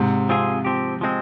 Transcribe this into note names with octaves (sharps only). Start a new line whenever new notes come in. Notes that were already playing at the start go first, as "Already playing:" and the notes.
Already playing: G#2 C3
F3 C4 F4 G#4
F3 C4 G4
F3 G#3 C4